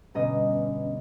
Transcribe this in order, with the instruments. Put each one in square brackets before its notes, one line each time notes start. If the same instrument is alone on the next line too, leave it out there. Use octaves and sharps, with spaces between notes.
[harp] G1 B2 D#5 [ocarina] C#4